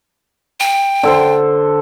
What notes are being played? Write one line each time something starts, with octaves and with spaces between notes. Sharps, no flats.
G5
D3 A4 C5